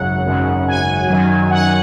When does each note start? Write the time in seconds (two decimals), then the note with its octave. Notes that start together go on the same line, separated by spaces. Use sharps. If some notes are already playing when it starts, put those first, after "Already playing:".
Already playing: G#1 F#2 C#3 F#3 F#5
0.26 G#1 F#2 C#3
0.68 G#5
1.10 F#2 D#3 F#3
1.51 F#5